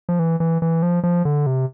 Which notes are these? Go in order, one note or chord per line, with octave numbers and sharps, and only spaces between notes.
F3
E3
E3
E3
F3
F3
D3
C3